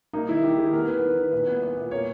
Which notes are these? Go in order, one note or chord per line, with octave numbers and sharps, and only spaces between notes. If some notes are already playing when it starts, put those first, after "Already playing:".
A#3 D#4
D#3 E4
D#3 G4
D#3 G#4
B3 A#4
B3 B4
D#3
D#3 B4
A#2 B4
B3
A#2
A#2
A#3 C#5